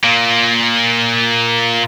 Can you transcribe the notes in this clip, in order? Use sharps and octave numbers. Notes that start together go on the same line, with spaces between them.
A#2 A#3